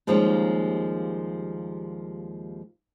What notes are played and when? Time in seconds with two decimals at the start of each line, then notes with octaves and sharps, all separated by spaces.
0.07 D#2 F3 G3 G#3 A#3 C#4